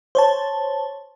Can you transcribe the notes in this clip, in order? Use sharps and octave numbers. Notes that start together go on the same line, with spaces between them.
C5 C#5 A5